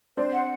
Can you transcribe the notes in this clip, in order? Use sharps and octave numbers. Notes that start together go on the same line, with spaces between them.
C4 D4 C5
F#5